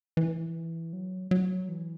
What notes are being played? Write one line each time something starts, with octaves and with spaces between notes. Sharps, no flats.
E3
F#3
F#3
E3